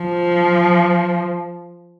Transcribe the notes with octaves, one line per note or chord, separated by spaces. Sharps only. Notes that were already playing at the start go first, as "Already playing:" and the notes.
Already playing: F3